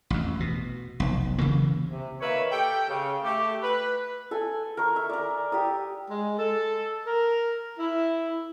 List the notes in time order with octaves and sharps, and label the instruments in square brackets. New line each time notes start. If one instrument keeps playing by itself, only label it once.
[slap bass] A1 F2
B2
F1 B1
C#3 E3 A#3
[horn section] C3
D#3 A#3 A#4 B4 C#5 E5
G4 A4 G5
C#3
A3 G4
B4
[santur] A4 G#5
A#4 C#6
E5
A#4 D5
G4 D5 D#6
[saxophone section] G#3
A4
A#4
E4